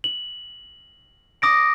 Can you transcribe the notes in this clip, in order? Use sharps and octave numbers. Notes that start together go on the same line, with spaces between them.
F#7
D6 D#6 A#6 D7